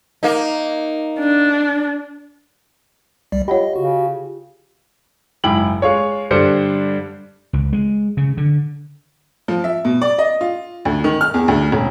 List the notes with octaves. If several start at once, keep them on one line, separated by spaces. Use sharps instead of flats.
A#3 D#4
D4
C2 G3 D5
F4 G4 C#5 D#5 F#5 B5
C#3 F#4
F#1 G#2 E4 G5 F#7
G#3 F4 C#5
G2 D3 G3 D4 C5 C#7
C#2
G#3
C#3
D3
F3
E5
B2
D5
D#5
F4
D2
D#3
F6
E2
D2
E1